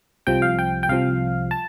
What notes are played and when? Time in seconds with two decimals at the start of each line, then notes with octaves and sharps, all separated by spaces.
0.27 C2 C3 F3 G5
0.42 F5
0.59 G5
0.83 G5
0.89 C2 C3 F3 F5
1.51 A5